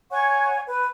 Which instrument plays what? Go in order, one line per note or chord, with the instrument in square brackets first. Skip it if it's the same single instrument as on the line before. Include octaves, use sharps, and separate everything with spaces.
[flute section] C#5 F#5 G#5 C#6
B4